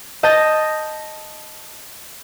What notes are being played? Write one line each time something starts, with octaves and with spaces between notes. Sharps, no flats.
D#5 A5 G6 A6 A#6